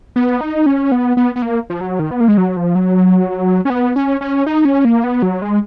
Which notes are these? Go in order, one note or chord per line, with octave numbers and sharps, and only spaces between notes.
B3
D#4
C#4
B3
B3
B3
A#3
F3
F#3
D#3
B3
A#3
G#3
F#3
F3
F#3
C#4
B3
C#4
C#4
D#4
C#4
A#3
B3
F#3
G#3